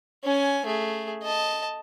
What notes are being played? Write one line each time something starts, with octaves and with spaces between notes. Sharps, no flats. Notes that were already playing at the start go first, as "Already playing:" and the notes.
C#4 G#5
A3 G#4
D#5 A5